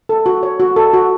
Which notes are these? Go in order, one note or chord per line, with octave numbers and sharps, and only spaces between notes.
A4
F#4
C#5
F#4
A4
F#4